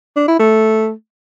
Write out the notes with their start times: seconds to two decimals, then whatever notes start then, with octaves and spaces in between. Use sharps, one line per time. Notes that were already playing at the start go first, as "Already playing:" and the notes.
0.16 D4
0.28 E4
0.39 A3